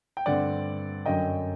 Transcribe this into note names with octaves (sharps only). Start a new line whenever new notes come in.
G5
G2 D3 A3 C4 D5 F#5
F#2 D3 F#3 D#5 G5